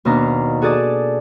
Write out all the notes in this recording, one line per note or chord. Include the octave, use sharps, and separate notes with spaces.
D#2 B2 D4 D#4 F5 A#5
F#4 G#4 A4 D5 A5 D#6